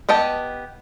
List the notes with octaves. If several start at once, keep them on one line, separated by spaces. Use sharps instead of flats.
B3 G4 D#5 A5